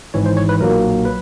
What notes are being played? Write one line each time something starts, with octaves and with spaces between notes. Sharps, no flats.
G#1 G#2 E3 C#5
C5
C#5
B4
B1 A#2 F#3 A#3 A#4
B4